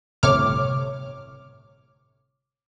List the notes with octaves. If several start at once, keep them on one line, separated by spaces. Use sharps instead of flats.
G1 A2 C3 C#5 D6 F6